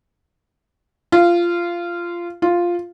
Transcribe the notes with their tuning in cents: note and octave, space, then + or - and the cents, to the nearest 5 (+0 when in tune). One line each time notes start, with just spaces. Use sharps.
F4 -15
F4 +0